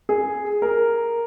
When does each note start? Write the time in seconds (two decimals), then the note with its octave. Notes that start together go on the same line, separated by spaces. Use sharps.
0.09 G#4
0.62 A#4